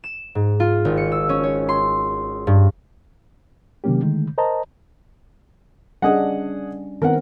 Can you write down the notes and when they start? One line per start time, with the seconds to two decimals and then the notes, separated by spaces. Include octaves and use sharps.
0.04 E7
0.35 G#2
0.60 F4
0.85 G#1
0.97 C#7
1.12 E6
1.29 C#4
1.43 C#5
1.69 C6
2.47 G2
3.84 C3 D#3 F#3 A#3 C#4 G4
4.01 D3 D#3 G#3 A3
4.38 A#4 C5 D#5 A5 A#5
6.02 G3 C#4 D4 G#4 D#5 F#5
7.02 D#3 B3 C4 A#4 F#5